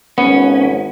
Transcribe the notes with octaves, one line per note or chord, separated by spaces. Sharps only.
G#1 B3 C#4